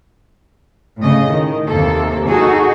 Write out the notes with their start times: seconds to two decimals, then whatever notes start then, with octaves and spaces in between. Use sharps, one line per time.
0.98 A2 C#3 D#5
1.30 D#3
1.67 D#2 C3 A#3 A4
2.25 D#4 F#4 G#4 A4